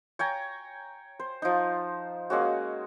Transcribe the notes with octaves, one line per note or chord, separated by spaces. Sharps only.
C#5 G5 G#5 A#5
C5
F3 D#4
G#3 A#3 C#4 F#4